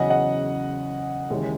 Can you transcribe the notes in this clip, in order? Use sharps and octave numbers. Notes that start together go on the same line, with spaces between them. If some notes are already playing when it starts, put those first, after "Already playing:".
Already playing: E2 C#3 F#3 C#4 D#5 F#5
D#5 F#5
D#2 C#3 E3 G#3 C#4